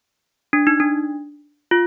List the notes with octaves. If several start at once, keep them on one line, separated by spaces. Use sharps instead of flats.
D4
D#4
D4
F4